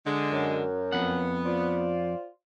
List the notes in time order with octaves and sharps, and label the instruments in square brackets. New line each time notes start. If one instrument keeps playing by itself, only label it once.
[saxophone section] D3 G#3
[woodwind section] F#2
[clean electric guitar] F2 F#5 [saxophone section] B3
[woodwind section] F4 C5 D5